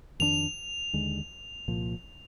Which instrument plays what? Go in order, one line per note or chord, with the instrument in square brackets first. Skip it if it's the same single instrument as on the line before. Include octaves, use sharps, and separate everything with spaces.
[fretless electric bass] F2 D#3 A#3 D4 [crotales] F7
[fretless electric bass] D#2 D3 G#3
C2 A#2 F3